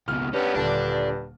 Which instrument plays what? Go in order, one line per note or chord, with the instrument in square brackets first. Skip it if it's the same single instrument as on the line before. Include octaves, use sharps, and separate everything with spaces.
[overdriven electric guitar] C#2 B2 [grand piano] F6
[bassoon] G2 [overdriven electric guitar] B3 C#4
[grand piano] D#1 D3 [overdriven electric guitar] D5 A5